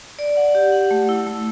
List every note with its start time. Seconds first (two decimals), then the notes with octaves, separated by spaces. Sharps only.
0.19 D5
0.37 F#5
0.55 G4
0.72 F#5
0.91 A3
1.09 E4
1.27 A3